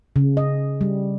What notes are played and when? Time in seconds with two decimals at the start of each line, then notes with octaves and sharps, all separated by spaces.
0.16 C#3
0.37 D#5
0.81 G3